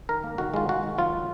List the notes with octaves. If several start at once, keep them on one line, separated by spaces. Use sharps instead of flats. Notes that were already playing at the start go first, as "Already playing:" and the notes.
D#3 A#4
A#3
D#3 F#4
G#3 F4
G#3 F#4
D#3
F#3 F4